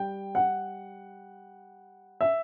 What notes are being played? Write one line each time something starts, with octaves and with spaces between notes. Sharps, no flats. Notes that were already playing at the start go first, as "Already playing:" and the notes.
Already playing: G3 G5
F#5
E5